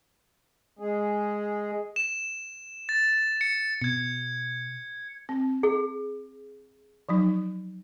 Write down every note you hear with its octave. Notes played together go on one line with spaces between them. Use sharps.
G#3 G#4
E7
A6
C#7
B2 G#6 C#7
C4
G#4
F3 F#3 D#4